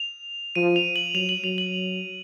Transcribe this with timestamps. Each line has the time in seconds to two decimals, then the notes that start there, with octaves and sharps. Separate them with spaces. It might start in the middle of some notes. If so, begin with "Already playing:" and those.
Already playing: F7
0.55 F3 D#7
0.76 F7
0.96 F#7
1.15 F#3 F7
1.29 F#7
1.44 F#3 F7
1.58 F#7